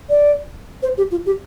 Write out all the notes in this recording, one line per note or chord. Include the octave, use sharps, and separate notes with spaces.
D5
C5
G4
F4
G4